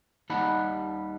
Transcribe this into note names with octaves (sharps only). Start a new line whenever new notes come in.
D#2 G3 D#4 F#5 A5 B5